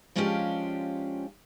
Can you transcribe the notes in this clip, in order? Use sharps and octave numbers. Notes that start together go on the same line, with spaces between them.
F3 G#3 C#4 D4 F4 G4